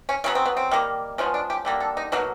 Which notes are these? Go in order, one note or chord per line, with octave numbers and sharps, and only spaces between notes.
C#4
C#3 F#3 B3 C#4
C4
B3
C4
D#3 G3 A#3
C#3 F3 G#3 B3 C#4
D4
G4
D3 G3 A#3
A4
D#4
B2 F#3 A#3 D#4